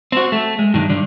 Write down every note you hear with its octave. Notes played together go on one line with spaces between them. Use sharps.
C4 F#4
A3
G#3
G2 D#3
G2 D3